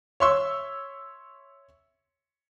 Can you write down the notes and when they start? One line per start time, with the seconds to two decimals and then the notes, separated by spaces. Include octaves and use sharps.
0.20 C#5 E5 C6 C#6 E6